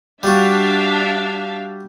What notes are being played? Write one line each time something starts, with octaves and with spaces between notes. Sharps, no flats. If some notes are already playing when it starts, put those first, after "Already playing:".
G3 D4 F#4 E5 F5